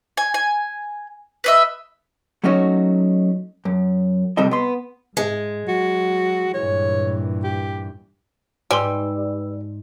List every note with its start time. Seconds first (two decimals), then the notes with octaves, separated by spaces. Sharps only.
0.17 G#5
0.34 G#5
1.44 B4 D#5 E5
2.44 F#3 A3 C#4 D#4 F#4 C#5
3.65 F#2
4.37 C2 C3 G3 A4 D#5
4.51 B3 C6
5.17 G#2 G#3
5.68 F#3 F#4
6.54 G2 A#2 E3 C#5
7.44 G4
8.71 G#2 G3 B4 D5 G#5 C6 E6